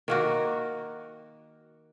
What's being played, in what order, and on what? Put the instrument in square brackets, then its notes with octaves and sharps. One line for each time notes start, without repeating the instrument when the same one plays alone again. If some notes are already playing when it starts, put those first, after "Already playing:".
[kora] D#3 A#3 F#4